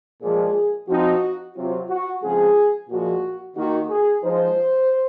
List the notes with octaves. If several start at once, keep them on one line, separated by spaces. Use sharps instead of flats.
A#2 F3 G#3 G#4
F3 C4 D#4 F#4
C3 F#3 C4 F4
F#4
C#3 F3 G#3 C4 F4 G#4
A#2 F3 G#3 F#4
D#3 A#3 D#4 F#4
G#4
F3 G#3 D#4 C5